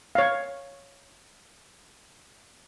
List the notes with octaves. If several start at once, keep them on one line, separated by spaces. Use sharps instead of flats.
C#5 F5